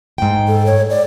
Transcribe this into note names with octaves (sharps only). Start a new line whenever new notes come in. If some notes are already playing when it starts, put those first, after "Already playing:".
G#2 G5
A4
C#5
D5